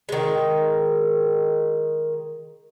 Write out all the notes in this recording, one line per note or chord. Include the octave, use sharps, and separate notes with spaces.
D#3 G#3